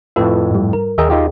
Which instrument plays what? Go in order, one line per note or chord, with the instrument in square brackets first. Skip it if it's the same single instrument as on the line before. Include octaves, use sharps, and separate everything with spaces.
[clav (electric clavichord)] F2 A2 E5 [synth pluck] F4 A4 B4
[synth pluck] G#2 G3
A#4
[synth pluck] D#2 G#4 G5 [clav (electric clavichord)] A#4 D#5 E5
[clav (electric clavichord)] D#4 F4 G4